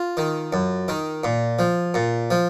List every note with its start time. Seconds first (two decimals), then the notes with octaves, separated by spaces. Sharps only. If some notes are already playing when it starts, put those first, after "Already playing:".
Already playing: F4
0.17 D#3
0.53 F#2
0.88 D#3
1.24 A#2
1.59 F3
1.94 A#2
2.31 F3